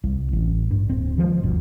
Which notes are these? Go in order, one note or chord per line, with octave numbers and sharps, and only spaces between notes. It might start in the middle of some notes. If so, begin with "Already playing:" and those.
C2
A1
G2
D1 C4
D#3 F3 G#3
G1 D2 B2